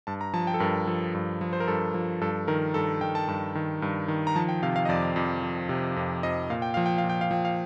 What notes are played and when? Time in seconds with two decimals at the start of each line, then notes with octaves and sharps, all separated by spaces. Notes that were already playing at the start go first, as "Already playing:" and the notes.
0.07 G2 A5
0.21 A#5
0.34 F3 A5
0.47 G5
0.54 A4
0.60 G2 A#4
0.87 F3 A4
1.14 G2
1.41 F3
1.53 C5
1.60 A#4
1.68 G2 A4
1.94 F3
2.21 G2 A4
2.48 D#3 A#4
2.74 G2 A4
3.01 D#3 G5
3.15 A5
3.28 G2 A5
3.55 D#3
3.82 G2
4.08 D#3
4.27 A#5
4.36 F3 A5
4.49 G5
4.63 C3 F5
4.76 F5
4.85 D#5
4.89 F2 D5
5.16 F2
5.43 F3
5.69 C3
5.96 F2
6.23 F2 D#5
6.50 A#2 F5
6.62 G5
6.74 F3 F5
6.86 G5
6.98 F5
7.04 A#2
7.10 G5
7.21 F5
7.31 F3 G5
7.45 F5